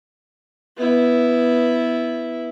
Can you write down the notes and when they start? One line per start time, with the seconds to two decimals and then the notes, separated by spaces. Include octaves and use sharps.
0.77 B3 E4